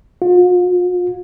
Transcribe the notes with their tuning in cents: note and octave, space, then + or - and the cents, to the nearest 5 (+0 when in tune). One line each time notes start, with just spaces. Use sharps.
F4 +45